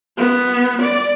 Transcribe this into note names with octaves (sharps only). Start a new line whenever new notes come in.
B3
D5